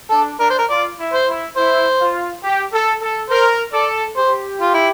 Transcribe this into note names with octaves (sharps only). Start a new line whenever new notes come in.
D4 A4
D4 A#4
C5
A#4
F4 D5
E4
C5
E4
E4 C5
F4
G4
A4
A4
A#4 C5
A4 D5
G4 C5
F4
E4